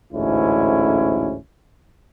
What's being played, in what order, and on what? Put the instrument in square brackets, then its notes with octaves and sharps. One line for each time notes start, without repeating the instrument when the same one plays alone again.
[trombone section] A1 D2 G#2 C#4 E4